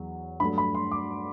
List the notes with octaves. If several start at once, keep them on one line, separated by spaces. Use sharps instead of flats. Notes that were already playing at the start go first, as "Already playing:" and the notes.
Already playing: E2 F#3
G2 F#3 A3 B5
B5
C6
D6